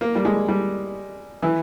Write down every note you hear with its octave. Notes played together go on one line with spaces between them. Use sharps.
A#3
G3
G#3
G3
E3